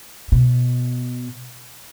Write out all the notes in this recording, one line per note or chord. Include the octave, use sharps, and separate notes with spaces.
B2